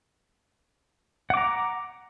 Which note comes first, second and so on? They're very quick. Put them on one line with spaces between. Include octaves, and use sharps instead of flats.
F#5 D6 A#5